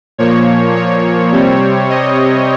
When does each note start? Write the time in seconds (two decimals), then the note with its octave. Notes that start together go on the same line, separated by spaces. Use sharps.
0.18 A#2 F3 A#3 C#5
0.76 C#5
1.32 C3 G3 C4
1.90 D#5